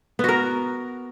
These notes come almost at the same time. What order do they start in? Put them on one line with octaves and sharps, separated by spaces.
B3 F#4 A#4